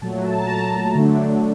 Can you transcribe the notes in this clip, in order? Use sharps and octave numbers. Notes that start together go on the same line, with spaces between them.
A#2 F#3 A3 A5
A5
A#5
A5
D3 F#3 A3 D4